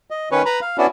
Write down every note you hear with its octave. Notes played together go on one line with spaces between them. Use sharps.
D#5
D#3 C#4 B4 C#5
B4 A#5 B5
F5
B3 C#4 D4 E4 F#4